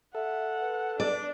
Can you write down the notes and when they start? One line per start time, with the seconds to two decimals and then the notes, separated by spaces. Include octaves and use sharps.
0.15 A4 E5 F#5
0.60 B4
1.00 D4 D5